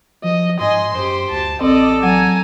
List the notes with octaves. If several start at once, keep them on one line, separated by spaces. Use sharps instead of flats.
F3 D#5
G#2 D#5 G#5 C6
F#2 G4 C5
D2 A5
A1 C4 A4 D5 D#5
F#3 G#5 A#5